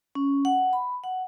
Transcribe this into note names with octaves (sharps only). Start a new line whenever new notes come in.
C#4
F#5
B5
F#5